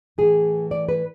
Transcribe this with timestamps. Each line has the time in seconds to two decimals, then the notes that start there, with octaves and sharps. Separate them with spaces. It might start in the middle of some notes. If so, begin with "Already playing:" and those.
0.18 A2 E3 G#4
0.71 D5
0.89 B4